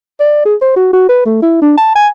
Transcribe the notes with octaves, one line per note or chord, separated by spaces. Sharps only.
D5
G#4
C5
F#4
F#4
B4
A3
E4
D4
A5
G#5